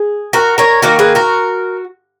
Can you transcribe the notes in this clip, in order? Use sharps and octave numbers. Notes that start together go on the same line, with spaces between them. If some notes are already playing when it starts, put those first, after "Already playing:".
Already playing: G#4
F#4 A#4
A#4 C#5
D#3 A#3 F#4 A#4
G#4 B4
F#4 A#4